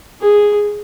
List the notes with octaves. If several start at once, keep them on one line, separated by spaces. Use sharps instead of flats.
G#4